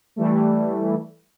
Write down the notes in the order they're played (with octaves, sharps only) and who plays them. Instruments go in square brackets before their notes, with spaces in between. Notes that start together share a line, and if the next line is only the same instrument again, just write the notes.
[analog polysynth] E3 G3 A3